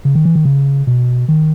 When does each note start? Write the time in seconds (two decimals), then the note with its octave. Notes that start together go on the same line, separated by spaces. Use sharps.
0.05 C#3
0.15 D#3
0.25 E3
0.35 D#3
0.45 C#3
0.87 B2
1.28 D#3